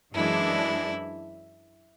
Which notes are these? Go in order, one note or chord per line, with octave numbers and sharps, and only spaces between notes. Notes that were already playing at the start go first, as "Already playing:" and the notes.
F#2 E3 G#3 D4 E4